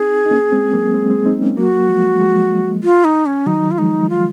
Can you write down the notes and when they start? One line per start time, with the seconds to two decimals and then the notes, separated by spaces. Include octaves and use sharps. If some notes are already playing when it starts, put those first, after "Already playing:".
Already playing: C4 D#4 G#4
0.26 D#4
0.31 A#3 C#4
0.52 G#3 C4
0.73 F#3 A#3
0.94 G#3 C4
1.10 G#3 C4
1.26 C4 D#4
1.41 A#3 C#4
1.57 F#3 A#3 F#4
1.88 F3 G#3
2.21 F3 G#3
2.84 F4
3.05 D#4
3.26 C#4
3.46 D#3 F#3 D#4
3.71 F4
3.78 F3 G#3 D#4
4.09 F4